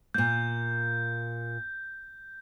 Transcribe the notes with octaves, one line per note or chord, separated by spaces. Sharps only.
A#2 A#3 G6